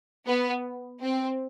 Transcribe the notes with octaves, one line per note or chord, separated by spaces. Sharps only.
B3
C4